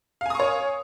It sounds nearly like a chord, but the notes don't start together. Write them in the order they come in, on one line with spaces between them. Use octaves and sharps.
F5 G#5 D#6 C#6 C#5